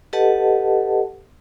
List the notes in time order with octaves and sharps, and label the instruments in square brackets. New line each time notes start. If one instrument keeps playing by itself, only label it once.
[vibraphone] G4 A4 B4 D#5 F#5 A5